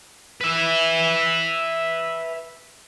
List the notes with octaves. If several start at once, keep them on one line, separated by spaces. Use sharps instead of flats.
B4 E5